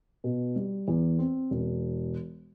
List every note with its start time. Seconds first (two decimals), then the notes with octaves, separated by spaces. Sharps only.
0.24 B2
0.56 G3
0.88 E2
1.19 C4
1.51 E1